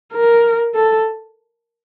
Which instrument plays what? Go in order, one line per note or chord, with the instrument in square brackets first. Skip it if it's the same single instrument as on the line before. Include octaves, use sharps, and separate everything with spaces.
[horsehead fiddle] A#4
A4